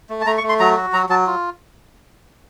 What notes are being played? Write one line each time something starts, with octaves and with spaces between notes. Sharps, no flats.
A3
A5
A3 A#5
C#6
A3
C6
F#3 A#5
F#4
F#3 A#5
F#3 A5
F4